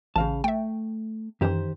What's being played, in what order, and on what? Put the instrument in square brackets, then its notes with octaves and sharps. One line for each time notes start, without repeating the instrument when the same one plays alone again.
[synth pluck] A1 [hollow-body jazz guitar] C#3 F5 A5
[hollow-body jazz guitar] A3 [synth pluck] E5 G5
[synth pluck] F#2 E3 [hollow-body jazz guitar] D#3 G4 C5